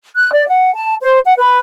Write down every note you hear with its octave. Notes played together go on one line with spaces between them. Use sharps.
F#6
D5
F#5
A5
C5
F#5
B4